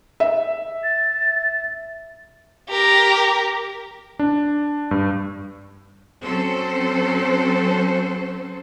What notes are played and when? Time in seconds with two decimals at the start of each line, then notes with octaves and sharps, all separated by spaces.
0.20 E5
0.83 A6
2.69 G4 A#4
4.19 D4
4.91 G2
6.24 F#3 C4 C#4 A4 C5